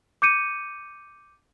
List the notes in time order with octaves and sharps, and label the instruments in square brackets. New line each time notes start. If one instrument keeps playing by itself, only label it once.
[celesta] D6 G6 C#7 D#7